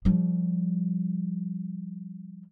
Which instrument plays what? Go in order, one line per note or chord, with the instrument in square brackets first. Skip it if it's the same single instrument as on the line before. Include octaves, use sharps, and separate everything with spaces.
[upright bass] F3 G3